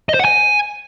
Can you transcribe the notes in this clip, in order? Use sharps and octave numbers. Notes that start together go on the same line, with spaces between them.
D#5
C5
F#5
G#5